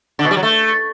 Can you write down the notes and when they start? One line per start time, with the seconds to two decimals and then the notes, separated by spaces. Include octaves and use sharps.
0.19 D3
0.25 B2
0.31 G3
0.37 F#3
0.43 A3